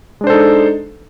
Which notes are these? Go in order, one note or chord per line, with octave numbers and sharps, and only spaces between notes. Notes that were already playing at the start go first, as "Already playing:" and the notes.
G#3 D4 D#4 A4 C5